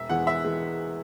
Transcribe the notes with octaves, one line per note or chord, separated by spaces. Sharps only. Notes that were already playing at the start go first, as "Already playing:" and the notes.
Already playing: E1 E5
E2 E3 G#3 F#5
E1 E5
E3 G#3